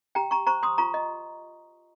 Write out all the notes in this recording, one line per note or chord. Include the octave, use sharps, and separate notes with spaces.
G4 G5 A#5
A#5 C#6
C5 A#5 C#6
C6 D#6
F4 A#5 C#6
D#5